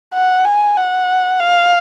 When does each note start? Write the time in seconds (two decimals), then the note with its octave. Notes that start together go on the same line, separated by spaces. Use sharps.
0.14 F#5
0.45 G#5
0.76 F#5
1.40 F5